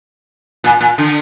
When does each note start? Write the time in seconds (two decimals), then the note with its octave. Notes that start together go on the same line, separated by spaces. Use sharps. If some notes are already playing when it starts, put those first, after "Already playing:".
0.64 A#2
0.81 A#2
0.98 D3